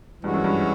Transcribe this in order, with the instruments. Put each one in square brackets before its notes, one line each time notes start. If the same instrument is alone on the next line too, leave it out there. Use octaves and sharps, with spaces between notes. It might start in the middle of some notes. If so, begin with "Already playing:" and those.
[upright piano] G2 [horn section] E3 G#3 C#4 F#4
[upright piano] F#2
G2